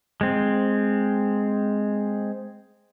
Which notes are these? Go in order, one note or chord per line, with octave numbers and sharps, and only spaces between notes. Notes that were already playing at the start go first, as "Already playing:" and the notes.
G#3 C4